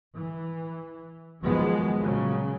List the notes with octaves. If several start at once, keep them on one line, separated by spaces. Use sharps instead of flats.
E3
D#3 F3 F#3 G#3 B3
A#2 C#3 F#3